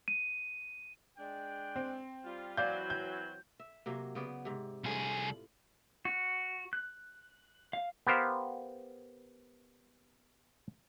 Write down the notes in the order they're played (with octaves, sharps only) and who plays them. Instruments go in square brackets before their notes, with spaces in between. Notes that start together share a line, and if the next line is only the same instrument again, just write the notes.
[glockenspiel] D#7
[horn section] G#3 D4 G5
[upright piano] C4
[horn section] G3 F4
[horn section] E3 F#3 C4 [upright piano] D5 F5 G6
[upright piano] G6
[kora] E5
C3 F#3 A#3
C#3 B3 D5
G#2 C3
[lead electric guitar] C2 G#4 [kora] A2 F4
[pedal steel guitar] F#4
F#6
F5
[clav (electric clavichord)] B3 G4 A#4 C5 F5